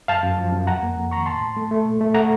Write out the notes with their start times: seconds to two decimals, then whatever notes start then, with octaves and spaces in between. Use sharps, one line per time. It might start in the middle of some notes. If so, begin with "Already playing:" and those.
0.08 F#2 F5 A5
0.23 F#2
0.38 F3
0.52 F#2
0.67 F2 F#5 A#5
0.83 A#3
0.97 F2
1.11 D#3 A#5 C#6
1.26 A2 A5 C6
1.41 A2
1.57 A3
1.71 A3
1.85 A#2
2.01 A3
2.14 A3 F#5 A#5